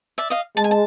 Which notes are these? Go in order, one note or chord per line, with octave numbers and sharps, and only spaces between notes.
D5 E5
D#5 F5
G#3 A5
G#5
A5